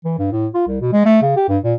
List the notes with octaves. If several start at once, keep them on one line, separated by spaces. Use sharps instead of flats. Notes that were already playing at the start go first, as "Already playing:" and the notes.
E3
G2
A2
F4
C2
B2
G#3
A3
C#3
G4
G2
A#2